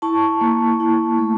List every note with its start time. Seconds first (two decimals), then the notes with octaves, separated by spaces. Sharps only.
0.02 E4 A5 C#6
0.41 A#3
0.80 E4
1.18 A3